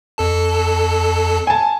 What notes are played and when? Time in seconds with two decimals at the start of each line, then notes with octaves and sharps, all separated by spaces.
0.18 F2 A4 A5
1.47 G#5 A5